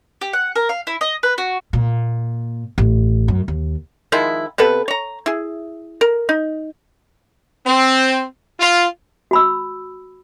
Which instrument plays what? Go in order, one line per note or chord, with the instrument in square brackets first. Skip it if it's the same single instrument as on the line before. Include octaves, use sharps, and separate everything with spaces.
[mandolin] G4
F#5
A#4
F5
E4
D#5
B4
F#4
[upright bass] A#2
A1
F#2
D#2
[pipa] D#3 F3 G#3 E4
C3 B3 A4 B4
C#5 A#5
E4 G#4
A#4
D#4
[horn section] C4
F4
[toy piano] F#4 B5 E6